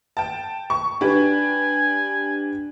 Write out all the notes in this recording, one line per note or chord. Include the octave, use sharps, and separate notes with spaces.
G5 A5
C#6
D4 G4 B4 G#5